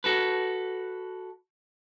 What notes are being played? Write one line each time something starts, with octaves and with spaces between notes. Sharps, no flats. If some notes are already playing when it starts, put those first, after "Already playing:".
F#4 A4 B4